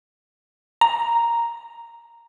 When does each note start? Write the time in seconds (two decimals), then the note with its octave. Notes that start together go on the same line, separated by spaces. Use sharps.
0.81 A#5